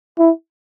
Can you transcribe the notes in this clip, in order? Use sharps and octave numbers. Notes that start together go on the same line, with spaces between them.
E4